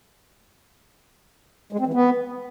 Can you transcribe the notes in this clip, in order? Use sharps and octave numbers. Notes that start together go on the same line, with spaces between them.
G#3
C4
E3
B3